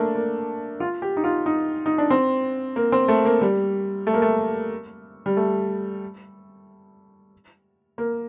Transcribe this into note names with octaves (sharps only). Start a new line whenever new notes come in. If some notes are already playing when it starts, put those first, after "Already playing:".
Already playing: A3 A#3 D4
A#3
F4
G4
D#4
F4
D#4
D#4
D4
C4
A#3
C4
A3
A#3
G3
A3
A#3
A3
G3
A3
A#3